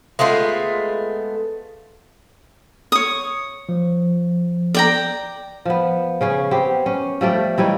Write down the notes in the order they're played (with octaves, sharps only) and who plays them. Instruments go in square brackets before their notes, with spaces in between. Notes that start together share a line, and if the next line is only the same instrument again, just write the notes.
[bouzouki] G#3 A3 B3 F4
[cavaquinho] C#5 D#6
[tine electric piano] F3
[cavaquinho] D5 G5 A#5
[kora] F3 B3
C#3 C#4 G#4
B3 C4 G4
C#4
F3 G3 A3 D5
E3 G3 D#4 C#5